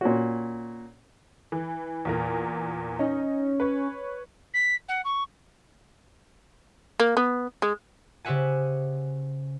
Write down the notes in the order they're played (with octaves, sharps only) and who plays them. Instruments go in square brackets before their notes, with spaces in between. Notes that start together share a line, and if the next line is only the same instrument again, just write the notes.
[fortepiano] A#2 C#4 F#4
[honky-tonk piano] E3
E2 A#2 A#4
[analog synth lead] C#4 [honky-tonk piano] D#4
[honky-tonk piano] B4 C#5
[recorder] B6
F#5
C#6
[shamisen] A#3
B3
G#3
[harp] C#3 G4 C5 E5 F#5 G#5